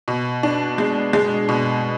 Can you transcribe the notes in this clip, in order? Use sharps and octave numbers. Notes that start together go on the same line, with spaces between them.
B2
D4
G#3
G#3
B2